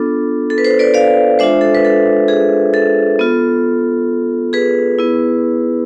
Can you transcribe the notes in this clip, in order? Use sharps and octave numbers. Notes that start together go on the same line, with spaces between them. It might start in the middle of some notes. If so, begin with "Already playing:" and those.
Already playing: B3 D4 F4 A4
A4
B4
A4 C5
B4 D5
D5 F5
G#3 D4 F4 C5 E5
A4
B4
A4
G#4
A4
B3 F4
G#4 B4
B3 E4